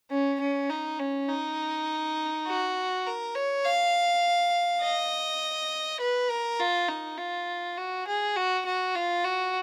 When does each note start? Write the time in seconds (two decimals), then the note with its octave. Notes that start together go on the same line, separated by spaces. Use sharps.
0.11 C#4
0.40 C#4
0.70 D#4
0.99 C#4
1.29 D#4
2.47 F#4
3.06 A#4
3.35 C#5
3.64 F5
4.82 D#5
6.01 B4
6.30 A#4
6.60 F4
6.89 D#4
7.18 F4
7.78 F#4
8.07 G#4
8.36 F#4
8.66 F#4
8.95 F4
9.24 F#4